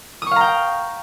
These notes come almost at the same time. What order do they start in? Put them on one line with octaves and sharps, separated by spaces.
D#6 C#6 F5 A#5 G5